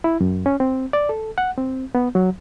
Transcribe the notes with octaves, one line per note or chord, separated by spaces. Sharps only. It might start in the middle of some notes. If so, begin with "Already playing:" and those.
E4
F#2
C#4
C4
D5
A4
F#5
C4
B3
F#3